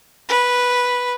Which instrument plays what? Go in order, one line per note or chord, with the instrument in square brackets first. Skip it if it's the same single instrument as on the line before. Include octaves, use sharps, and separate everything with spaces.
[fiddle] B4